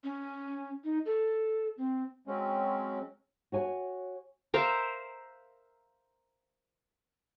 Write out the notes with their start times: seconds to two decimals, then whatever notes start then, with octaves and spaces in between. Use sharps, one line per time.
0.04 C#4
0.84 D#4
1.06 A4
1.77 C4
2.27 F#3 G#3 C4 C#4
3.52 F#4 C#5 G#5
4.54 A#4 C5 E5 F5